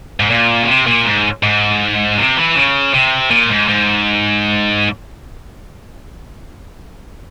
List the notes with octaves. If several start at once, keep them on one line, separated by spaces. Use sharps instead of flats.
G#2
A#2
C#3
C3
A#2
G#2
G#2
C3
E3
C#3
C3
A#2
G#2
G#2